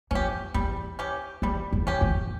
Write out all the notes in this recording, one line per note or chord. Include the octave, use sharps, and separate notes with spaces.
F2 C#4 G4
E2 G3
C#4 G4
E2 G3
E2
C#4 G4
F2